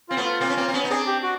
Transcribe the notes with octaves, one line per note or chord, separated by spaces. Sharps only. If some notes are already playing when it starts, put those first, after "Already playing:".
C4 F4
A3 B3
F4
A#3 C4
C#4
A#3 C4
C4
B3 C#4
D#4
C4 D4 G#4
G4
F#4